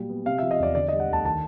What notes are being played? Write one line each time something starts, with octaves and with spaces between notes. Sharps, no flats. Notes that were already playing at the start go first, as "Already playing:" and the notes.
Already playing: A#2 F#3 G3
B3
C3 F5
F3 E5
D#5
E2 D5
D3 D5
G3 D#5
F#5
D2 A5
D#3 A5